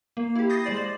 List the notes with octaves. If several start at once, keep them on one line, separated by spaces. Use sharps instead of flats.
A#3
E4 G4
D#6 G6 A6 A#6 C7
G#3 C5 D5 A6
F#7